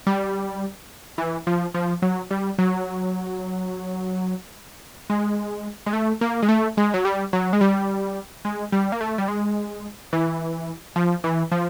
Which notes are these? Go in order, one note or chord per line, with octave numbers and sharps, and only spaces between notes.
G3
E3
F3
F3
F#3
G3
F#3
G#3
G#3
A3
A#3
G#3
A3
G#3
F#3
G3
F#3
G#3
G3
G#3
G3
A#3
A3
G3
G#3
E3
F3
E3
F3